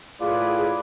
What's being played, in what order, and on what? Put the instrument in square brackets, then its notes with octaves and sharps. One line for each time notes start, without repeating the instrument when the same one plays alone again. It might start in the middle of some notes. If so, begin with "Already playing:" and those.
[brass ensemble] A2 B4 [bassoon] F4 [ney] G#4 [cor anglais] D5